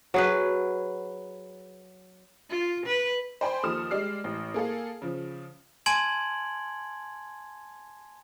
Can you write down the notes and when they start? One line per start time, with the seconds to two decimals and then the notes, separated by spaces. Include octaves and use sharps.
0.14 F#3 G#4 B4
2.50 F4
2.86 B4
3.41 C5 D5 G5 G#5 B5 C6
3.63 D#2 F3 A4 D#6 F6 E7
3.91 G3 G#3 D5 F6 C7
4.24 A1
4.54 A#3 G#4 A4 F5
5.02 C#3 F3
5.86 G#5 A5 C6 G#6 D7 F#7